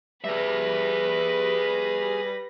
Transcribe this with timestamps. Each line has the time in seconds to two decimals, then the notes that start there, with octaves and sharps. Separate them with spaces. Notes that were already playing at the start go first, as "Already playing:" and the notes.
0.24 G3 G#4 B4 E5 A#6